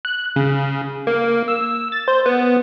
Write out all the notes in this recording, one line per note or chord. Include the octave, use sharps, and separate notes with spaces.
F#6
C#3
A#3
E6
A6
C5
B3